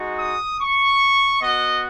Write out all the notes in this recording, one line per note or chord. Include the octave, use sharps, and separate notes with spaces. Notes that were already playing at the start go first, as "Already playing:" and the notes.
Already playing: G#3 D#4 F#4
D#6
C#6
B3 F#4 D#5